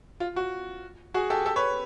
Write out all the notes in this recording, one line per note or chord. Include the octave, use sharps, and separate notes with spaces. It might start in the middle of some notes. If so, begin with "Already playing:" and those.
F4
F#4
F#4 G#4
G4 A4
G4 A4
B4 C#5